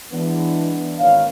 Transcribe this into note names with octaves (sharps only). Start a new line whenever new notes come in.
E3 G#3 B3 D4
G#1 A#3 D#4 B4 C#5 F5